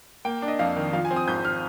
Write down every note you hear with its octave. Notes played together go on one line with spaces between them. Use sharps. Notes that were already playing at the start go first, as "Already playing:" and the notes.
A#3 G5
D4
D#5
F2 F5
D#3
F3 F5
G#5
C4
D#6
G#1 G6
F6